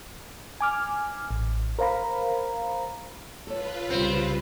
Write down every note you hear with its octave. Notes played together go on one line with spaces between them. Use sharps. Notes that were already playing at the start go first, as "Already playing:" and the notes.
G#5 D6 F6
A1
A#4 C5 F5 A#5 B5
F4 A4 B4 C#5
C2 C#3 G3 B3 C4